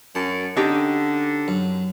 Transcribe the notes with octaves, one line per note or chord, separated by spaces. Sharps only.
F#2 A5
D3 C#4 D#4 G4
F#2